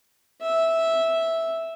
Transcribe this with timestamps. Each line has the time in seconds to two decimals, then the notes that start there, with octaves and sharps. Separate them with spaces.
0.41 E5